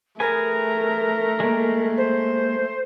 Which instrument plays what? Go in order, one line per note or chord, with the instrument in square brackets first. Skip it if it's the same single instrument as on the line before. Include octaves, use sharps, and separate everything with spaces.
[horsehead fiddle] A3 [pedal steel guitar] G#4 B4 G#5 [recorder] A#4
[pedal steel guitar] G#3 A#3
[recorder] C5